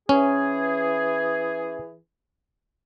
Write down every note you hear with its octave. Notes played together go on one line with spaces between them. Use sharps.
E3 C#4 G#4